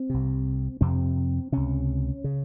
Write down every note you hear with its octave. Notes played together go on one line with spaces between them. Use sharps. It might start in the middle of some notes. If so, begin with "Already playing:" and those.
Already playing: C4
C2 C3
F2 C3 C4
C#2 C3 C#4
C#3